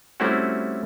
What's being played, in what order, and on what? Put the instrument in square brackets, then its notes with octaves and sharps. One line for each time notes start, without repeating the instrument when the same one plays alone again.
[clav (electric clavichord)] G3 A3 C4 C#4 E4 F#4